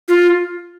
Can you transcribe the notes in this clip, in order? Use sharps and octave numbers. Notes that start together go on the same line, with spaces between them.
F4